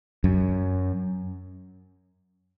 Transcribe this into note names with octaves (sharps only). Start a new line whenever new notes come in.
F#2